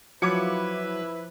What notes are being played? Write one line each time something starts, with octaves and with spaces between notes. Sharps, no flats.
F3 F#3 E4 B4 D6 G#6 C#7